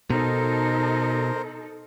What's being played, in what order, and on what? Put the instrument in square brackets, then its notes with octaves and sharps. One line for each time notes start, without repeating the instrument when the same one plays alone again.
[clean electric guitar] B2 [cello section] D#4 A4 [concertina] A#4 C5